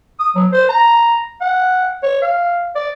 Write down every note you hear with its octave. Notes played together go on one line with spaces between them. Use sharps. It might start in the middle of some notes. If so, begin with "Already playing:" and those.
D#6
F#3
C5
A#5
F#5
C#5
F5
D5